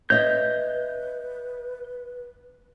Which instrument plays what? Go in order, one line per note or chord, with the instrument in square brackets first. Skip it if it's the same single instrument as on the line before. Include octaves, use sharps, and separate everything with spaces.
[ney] B4 [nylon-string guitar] C#5 D#5 E5 [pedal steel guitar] G6